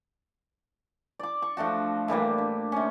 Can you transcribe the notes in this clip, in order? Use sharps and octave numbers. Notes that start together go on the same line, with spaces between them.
D5 D6
C#6
F3 A3 D4 F#4
A2 E3 G3 A#3
D4
C3 C#4